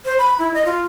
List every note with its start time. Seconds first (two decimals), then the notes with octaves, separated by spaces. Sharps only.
0.05 C5
0.19 B5
0.39 E4
0.54 D#5
0.65 F4